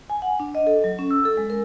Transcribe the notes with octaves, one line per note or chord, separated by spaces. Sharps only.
G#5
F#5
D4
D#5
A4
F#3
C#4
E6
A4
G#3
A#4